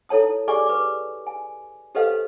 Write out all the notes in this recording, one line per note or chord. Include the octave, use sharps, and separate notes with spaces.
E4 A4 C#5 A5 D#6
G4 G#4 D5 G#5 C#6 D6
B4 D6
G#5
G4 A4 B4 C5 D#5 F5